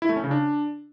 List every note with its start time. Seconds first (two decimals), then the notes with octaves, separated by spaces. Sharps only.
0.02 E4
0.09 A3
0.16 C#4
0.24 C#3
0.31 D4